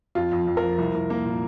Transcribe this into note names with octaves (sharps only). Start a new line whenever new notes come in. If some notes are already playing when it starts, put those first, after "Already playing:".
F2 F4
F2
F2
A#4
F3
C2
C2
A#3
A#2